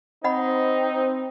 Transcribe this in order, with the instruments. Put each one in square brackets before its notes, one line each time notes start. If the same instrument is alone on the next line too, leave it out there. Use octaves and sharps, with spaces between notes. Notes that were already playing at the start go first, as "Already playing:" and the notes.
[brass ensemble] C4 [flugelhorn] D#4 [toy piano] D#5 F#5 B5